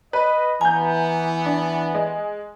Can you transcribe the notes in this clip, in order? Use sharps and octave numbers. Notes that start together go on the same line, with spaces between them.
B4 D#5
E3 B3 G#5 A#5 G6
D4
G#3